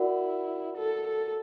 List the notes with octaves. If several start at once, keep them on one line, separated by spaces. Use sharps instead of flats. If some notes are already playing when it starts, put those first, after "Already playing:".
Already playing: E4 F#4 A#4 D5 F#5
A4
A4